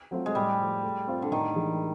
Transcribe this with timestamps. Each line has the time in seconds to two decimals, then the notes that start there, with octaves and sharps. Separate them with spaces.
0.11 F#3 A3 C4 F4
0.26 G#3
0.35 A2 G3
0.59 F3 A3
0.83 A3
1.07 C4 F4 A4 C5
1.22 D3
1.31 A2 D#3
1.55 E3 G#3